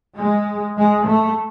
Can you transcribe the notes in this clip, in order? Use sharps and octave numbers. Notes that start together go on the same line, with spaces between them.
G#3
G#3
A3